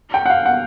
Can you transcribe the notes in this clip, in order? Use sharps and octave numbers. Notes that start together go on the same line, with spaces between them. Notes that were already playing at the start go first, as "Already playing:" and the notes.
G5
F#5
F5
F#5